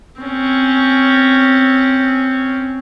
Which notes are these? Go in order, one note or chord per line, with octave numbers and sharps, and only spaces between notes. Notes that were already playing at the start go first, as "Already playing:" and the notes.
C4 C#4